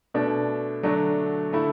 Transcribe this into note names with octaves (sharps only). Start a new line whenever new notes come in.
B2 A3 D4
D3 F#3 A3 D4 F#4
D3 A3 E4